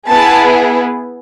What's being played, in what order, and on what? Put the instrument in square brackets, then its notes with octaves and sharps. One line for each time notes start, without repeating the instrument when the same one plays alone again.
[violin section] B3 E4 G#4 A5